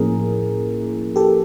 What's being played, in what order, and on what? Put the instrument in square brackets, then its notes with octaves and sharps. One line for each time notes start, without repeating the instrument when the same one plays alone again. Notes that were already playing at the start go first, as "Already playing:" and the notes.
Already playing: [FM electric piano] A2 F3 A#3 C#4 E4 G#4 A#4
G4 A4